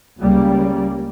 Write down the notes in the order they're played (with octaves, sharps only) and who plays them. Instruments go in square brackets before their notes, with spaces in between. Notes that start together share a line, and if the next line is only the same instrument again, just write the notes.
[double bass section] C#2 C#3 G3 A#3